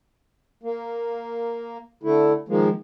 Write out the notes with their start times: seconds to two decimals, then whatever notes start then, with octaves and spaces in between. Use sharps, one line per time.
0.63 A#3
2.03 D3 A3 E4
2.49 D#3 F3 G#3 A#3